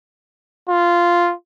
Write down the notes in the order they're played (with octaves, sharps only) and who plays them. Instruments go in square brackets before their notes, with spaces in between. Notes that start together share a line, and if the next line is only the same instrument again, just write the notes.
[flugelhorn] F4